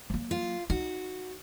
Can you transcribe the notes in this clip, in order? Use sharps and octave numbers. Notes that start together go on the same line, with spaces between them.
F#3 A#3
F4
D#4 F#4